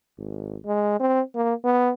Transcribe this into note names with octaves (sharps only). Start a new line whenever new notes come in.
G#1
G#3
C4
A#3
B3